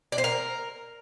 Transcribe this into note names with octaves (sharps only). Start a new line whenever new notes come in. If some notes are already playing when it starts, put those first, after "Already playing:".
D4
C5
A#4